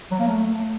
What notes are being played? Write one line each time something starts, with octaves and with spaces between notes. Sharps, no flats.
F#3
A#3
A3